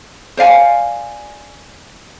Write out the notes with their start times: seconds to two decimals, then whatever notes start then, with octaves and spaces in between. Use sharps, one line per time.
0.37 C5 D5 F5 G#5